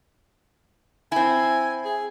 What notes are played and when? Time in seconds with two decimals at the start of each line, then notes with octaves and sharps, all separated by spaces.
1.12 C4 E4 G#5
1.85 G#4